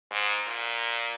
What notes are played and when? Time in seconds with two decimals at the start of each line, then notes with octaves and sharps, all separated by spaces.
0.11 G#2
0.47 A#2